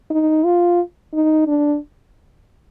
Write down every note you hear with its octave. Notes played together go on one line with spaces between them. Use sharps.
D#4
F4
D#4
D4